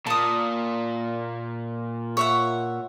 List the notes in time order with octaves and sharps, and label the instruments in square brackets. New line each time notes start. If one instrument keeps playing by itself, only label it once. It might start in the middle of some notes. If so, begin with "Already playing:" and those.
[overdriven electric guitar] A#2 [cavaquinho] A5 D#6
[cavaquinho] C#5 E5 F#5